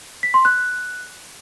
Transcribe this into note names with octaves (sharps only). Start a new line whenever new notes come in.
B6
C6
F#6